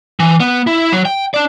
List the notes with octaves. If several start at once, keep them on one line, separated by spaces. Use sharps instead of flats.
E3
B3
E4
F#3
G5
D4 D5